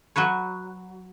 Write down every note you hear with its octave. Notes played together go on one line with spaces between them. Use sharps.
F#3 F#4 B4 C#5